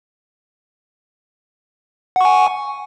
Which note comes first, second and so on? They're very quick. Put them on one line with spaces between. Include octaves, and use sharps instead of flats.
F#5 C#6 G#5